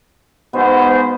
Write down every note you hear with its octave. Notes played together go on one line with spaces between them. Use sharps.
G#2 B2 B3 C5